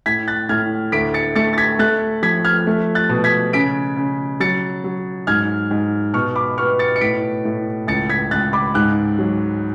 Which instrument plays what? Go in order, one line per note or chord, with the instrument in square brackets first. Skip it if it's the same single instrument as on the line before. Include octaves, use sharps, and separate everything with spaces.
[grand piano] A2 G#6 B6
F#6 A6
A2 F6 G#6
D2 B6 D7
A6 C#7
A3 A6 C#7
A6
G#6 B6
A3 F#6 A6
F3 G#6 B6
F6 G#6
A3
F#6 A6
B2
G#6 B6
C#3 B6 D7
C#3
F#3 A6 C#7
F#3
G#2 F6 G#6
G#2
B2 C#6 F6
B5 D6
B3 C#6 F6
A6 C#7
C#7
A2 B6 D7
A2
C#2 A6 C#7
G#6 B6
C#2 F#6 A6
B5 D6
G#2 D6 F#6
F#3